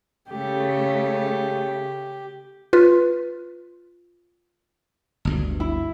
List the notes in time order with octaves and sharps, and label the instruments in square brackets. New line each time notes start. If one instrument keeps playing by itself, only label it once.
[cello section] C#3 A3 [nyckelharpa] G4
[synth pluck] F4 B4
[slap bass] G1 D2 G2
[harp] E4